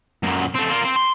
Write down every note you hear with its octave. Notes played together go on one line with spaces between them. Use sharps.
F#2 A#2
A3 C4
A#3 F4
C4
C6